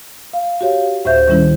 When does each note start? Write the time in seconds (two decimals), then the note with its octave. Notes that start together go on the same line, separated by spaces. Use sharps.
0.33 F5
0.61 F#4 G4 C#5 F5
1.05 D2 A2 C5 E5 G6
1.27 A2 D#3 G3 C#4 E4